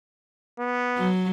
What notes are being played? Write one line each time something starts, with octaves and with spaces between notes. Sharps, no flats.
B3
F#3